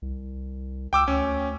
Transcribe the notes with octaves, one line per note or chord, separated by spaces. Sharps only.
C2
C#2 G5 D6 E6
D2 C#4